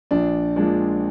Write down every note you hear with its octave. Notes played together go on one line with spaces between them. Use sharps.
A#1 D4
A#2 F3 G#3 D4